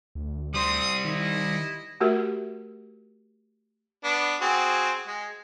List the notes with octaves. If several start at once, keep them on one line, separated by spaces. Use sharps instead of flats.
D2
G3 C4 C5 D#6
D#3 E4 D#5
A3 F#4 G4 A#4 E5
B3 D4
C4 F#4 G#4
G#3